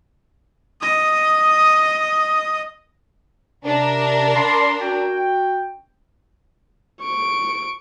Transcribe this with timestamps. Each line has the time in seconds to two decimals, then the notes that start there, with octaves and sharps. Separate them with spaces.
0.81 D#5 D#6
3.65 C3 D4 A#4
4.36 F5 B5 C6
4.82 F#4 G5
7.03 C#6 D7